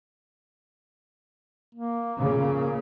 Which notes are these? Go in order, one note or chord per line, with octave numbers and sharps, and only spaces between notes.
A#3
A#2 C#3